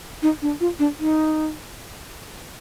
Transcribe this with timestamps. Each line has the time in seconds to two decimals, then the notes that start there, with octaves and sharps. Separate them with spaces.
0.22 D#4
0.42 D4
0.60 F4
0.79 D4
0.99 D#4